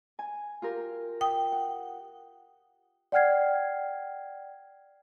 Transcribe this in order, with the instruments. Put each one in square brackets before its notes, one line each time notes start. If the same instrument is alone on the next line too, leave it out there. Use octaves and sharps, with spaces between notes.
[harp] G#5
F4 G4 A#4
[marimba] G5 D#6
[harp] F#5
[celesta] D5 F#5 G5 F6 G#6 C7